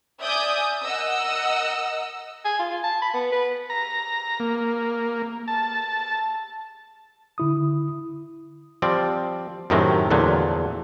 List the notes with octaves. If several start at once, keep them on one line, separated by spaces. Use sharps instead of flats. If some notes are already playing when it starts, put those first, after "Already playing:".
D5 E5 G#5 D#6 G6
A#4 D#5 F#5 E6
G#5
F4
F4
A5
B5
B3
B4
A#5
A#3
A5
D3 E4 D#6
F3 G3 C4 D5
F#2 A2 C3 D#3 F#3 C4
E2 A#2 D3 F3 F#3 A3